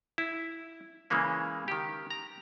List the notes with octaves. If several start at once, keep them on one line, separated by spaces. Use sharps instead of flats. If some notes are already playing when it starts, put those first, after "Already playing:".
E4
C#3 E3 G#3 A#3 C#4
D#3 G4
A#5